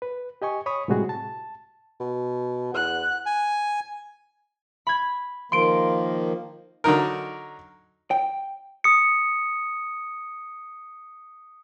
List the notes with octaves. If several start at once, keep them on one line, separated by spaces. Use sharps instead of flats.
B4
G4 D#5 G#5 C#6
C#5 B5 C#6 D#6
A2 C3 G3 G#3 F#4 G#4
A5
B2
E2 F#5 F#6
G#5
B5 G#6
D#3 F3 A#3 C6 D7
D3 F#3 D#4 A#4
G5
D#6 C#7